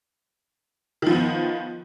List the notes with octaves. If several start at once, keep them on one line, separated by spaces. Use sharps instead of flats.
D#3 F3 B3